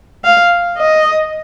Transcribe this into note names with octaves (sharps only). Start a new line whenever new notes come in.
F5
D#5